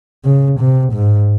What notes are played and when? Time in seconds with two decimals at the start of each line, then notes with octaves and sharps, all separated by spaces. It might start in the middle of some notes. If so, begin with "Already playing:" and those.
0.24 C#3
0.59 C3
0.93 G#2